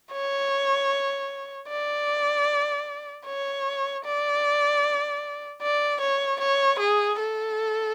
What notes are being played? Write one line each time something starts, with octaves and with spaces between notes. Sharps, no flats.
C#5
D5
C#5
D5
D5
C#5
C#5
G#4
A4